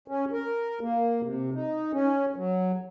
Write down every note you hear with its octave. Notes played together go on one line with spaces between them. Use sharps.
C#4
A#4
A#3
C3
D#4
C#4
F#3